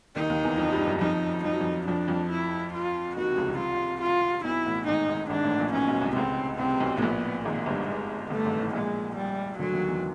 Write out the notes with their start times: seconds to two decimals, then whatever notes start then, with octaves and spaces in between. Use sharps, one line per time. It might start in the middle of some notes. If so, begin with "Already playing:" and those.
0.16 D#2 D#3 D#4
0.30 D#2 D#3
0.43 E2 E3
0.58 F2 F3
0.72 G2 G3
0.87 F#2 F#3
1.01 F2 F3 D#4
1.44 F3 D#4
1.53 F#3
1.60 F2 F3
1.87 F2 F3 D4
2.08 F2 F3
2.30 E4
2.73 F4
3.16 D#2 D#3 F#4
3.30 C3
3.37 C#2 C#3
3.48 C2 C3
3.58 F4
4.01 F4
4.44 B1 B2 E4
4.65 A1 A2
4.87 G#1 G#2 D#4
5.09 G#1 G#2
5.30 G#1 G#2 D4
5.44 A1 A2
5.58 A#1 A#2
5.73 B1 B2 C#4
5.88 B1 B2
6.02 C2 C3
6.16 C#2 C#3 C4
6.58 C2 C3 C4
6.80 B1 B2
6.97 A2
7.02 A#1 A#2 B3
7.45 G#1 G#2 A#3
7.66 G1 G2
7.88 G#3
8.30 G1 G2 A3
8.45 G#1 G#2
8.59 A1 A2
8.73 A#1 A#2 G#3
9.16 G3
9.59 D2 D3 F#3
9.73 D#2 D#3
9.87 E2 E3